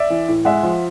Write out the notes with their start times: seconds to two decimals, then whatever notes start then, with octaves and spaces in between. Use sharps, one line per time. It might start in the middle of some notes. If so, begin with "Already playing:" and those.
Already playing: D5 E5
0.10 E3
0.28 A2
0.45 G#3 E5 F#5
0.63 F3